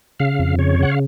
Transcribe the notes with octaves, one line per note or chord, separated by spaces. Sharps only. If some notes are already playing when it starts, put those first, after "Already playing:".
C#3 F5
F2
C#3 C#5
C#3 F#5
F5